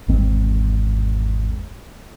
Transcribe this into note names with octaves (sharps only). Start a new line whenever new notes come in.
G#1 E2 G#3 C4